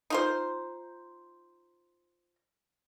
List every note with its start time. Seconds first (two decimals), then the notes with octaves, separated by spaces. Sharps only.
0.10 D#4 F4 C5